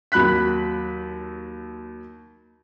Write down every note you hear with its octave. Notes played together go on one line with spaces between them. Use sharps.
D#2 F#3 B5 F#6 B6